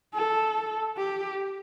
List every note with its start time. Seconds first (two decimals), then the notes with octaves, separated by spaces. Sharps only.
0.14 A4
0.97 G4